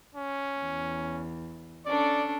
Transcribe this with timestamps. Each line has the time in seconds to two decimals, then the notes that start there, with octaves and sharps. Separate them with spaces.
0.15 C#4
0.59 E2
1.86 C#4 D4 A4 D5